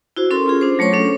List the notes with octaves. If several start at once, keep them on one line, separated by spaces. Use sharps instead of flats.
E4 F#4 C5
C#4 A4 A#4 C6
C#4 F4 G#4
D4 C5
F#3 A3 C5 C#5 C#6
C#4 D4 A4